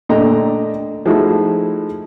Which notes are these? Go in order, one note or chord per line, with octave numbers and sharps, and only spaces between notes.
A#2 D3 A3 D#5 G5 A#5
F3 G#3 A3 D#4 E4 F#4